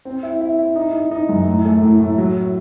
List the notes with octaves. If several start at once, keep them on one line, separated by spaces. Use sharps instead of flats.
C4
E4
E4
E4
D#4
D#4
D#4
F#2
A2
A3
A2
A2
F#3